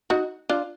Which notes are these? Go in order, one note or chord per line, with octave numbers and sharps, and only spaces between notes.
D#4 F#4
D4 F4